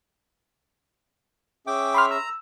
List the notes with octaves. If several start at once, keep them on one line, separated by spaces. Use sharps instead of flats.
C#4 G#4 E5 G5 D6
B5 C6 F6
A#5 E6